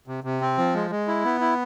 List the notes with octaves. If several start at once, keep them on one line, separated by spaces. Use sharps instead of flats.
C3
C3
C4
F3
G#3
G#3
E4
B3
E4